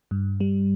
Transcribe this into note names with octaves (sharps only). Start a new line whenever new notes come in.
G2
G3